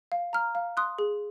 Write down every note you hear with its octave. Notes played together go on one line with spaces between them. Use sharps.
F5
A#5 F6
F5
C6 D#6 F#6
G#4